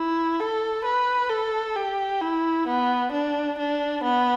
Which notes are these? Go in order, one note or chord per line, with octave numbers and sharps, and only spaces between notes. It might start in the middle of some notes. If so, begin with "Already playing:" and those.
Already playing: E4
A4
B4
A4
G4
E4
B3
D4
D4
B3